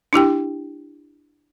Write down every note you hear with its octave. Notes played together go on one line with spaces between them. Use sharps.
D4 E4 G4 G5